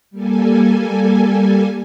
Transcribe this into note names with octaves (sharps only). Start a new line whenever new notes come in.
G3 A#3 A4 G#5